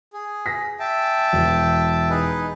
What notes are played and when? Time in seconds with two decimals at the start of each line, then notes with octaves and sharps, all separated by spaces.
0.13 G#4
0.46 G#5 A#6 B6
0.80 E5 G5 A5
1.33 E1
2.10 D#4 G#4 B4